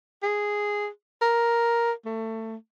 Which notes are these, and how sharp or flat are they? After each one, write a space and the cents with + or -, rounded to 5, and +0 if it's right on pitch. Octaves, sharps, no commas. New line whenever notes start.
G#4 -5
A#4 +5
A3 +25